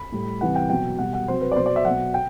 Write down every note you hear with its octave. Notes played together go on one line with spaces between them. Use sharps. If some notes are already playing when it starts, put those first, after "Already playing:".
Already playing: B5
A2 G3
C3 E3 G3 F#5
G5
B2 F#3 G5
B2 G3 F#5
F#5
C3 F#3 C5
B4
D5
B2 F#3 C5
D5
E5
F#3 F#5
B2
G5